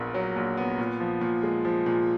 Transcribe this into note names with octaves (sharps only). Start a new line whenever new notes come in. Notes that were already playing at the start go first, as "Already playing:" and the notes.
Already playing: A#1 A#2 B3 A#4
F#3
A#1
B3
A#2
F3
A#2
G#3
F3
A#2